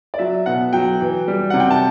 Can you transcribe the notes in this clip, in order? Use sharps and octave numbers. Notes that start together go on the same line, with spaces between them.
D5
F#3 E5
B2 F#5
F#3 G5
E3
G3
C3 F#5
G5
A5